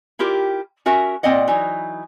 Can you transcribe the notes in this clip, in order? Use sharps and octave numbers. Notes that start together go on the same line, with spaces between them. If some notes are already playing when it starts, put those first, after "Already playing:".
E4 F4 G4 A#4
C#4 F#4 A#4 E5
A#2 C4 D5 D#5 F#5
E3 F#3 D#4